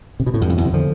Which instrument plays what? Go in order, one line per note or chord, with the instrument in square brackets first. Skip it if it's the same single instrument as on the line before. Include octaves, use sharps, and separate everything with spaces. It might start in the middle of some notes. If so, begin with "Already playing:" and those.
[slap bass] C3
B2
A2
E2 G2
F2
E2 G2
C3 E3
D3 F3